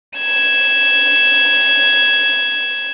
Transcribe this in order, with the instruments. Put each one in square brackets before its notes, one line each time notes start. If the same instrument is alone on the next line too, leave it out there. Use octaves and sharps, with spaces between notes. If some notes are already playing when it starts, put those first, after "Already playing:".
[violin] G#6 E7